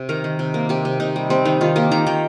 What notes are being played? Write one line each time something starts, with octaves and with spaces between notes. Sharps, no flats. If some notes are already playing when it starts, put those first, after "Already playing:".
Already playing: C3
D#3 A#4
D#3
C3
A#3
C3 G4
C3
C3 D#4
G3
G3 C4
D#3 D#4
D#3 F4
A#3 G4
D#3 A#5
D#3 G5